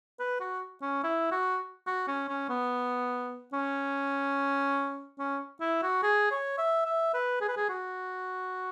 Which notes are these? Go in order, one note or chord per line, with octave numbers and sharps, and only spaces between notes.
B4
F#4
C#4
E4
F#4
F#4
C#4
C#4
B3
C#4
C#4
E4
F#4
G#4
C#5
E5
E5
B4
G#4
B4
G#4
F#4